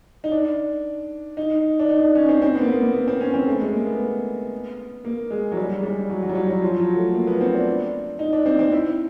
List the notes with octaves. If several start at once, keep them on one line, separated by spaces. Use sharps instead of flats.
D#4
D4
D#4
D4
D#4
D4
C#4
C4
C4
B3
A#3
B3
A#3
B3
C4
C#4
C4
A3
G#3
A#3
B3
A#3
G#3
F#3
G3
G#3
G3
F#3
F#3
G3
F#3
F#3
F3
F#3
A3
A#3
B3
C4
D4
D#4
D4
C4
C4
E4